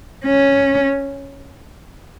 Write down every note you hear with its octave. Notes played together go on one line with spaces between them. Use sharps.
C#4